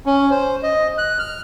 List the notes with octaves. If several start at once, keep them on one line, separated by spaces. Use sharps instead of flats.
C#4
C5
D#5
F#6
F6